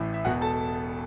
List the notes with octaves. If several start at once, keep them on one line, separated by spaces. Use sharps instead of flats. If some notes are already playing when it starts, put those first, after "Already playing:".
Already playing: A1 A2 E3
E5
E1 E2 B2 F#4 F#5
A4 A5